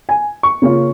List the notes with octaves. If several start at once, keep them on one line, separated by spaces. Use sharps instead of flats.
G#5
C#6
C#3 A#3 C#4 F4